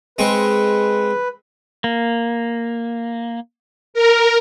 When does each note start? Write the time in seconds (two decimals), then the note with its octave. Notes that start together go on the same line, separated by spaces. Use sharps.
0.18 G#3 C4 B4 C#6
1.84 A#3
3.94 A#4